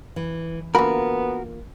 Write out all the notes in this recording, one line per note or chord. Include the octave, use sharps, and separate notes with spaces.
E3
D3 A#3 B3 F4 F#4 A#4 B5